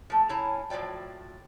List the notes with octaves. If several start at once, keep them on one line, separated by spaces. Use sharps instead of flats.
F3 A3
C#3 C#4 E4 A5 A#5
A2 F3 F#3 D5 G5